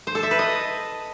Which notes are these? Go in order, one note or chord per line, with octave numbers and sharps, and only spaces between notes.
C5
A4
E5
B4
D#5